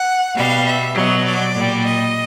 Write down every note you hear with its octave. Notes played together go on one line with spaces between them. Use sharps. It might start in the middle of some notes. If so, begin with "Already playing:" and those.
Already playing: F#5
B2 G3 F5
E5
B2 F#3 D#5
D5
A#2 G3
D#5